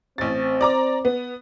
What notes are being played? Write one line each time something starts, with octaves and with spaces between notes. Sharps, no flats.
A1 C4 A6
D5 A#5 D6
B3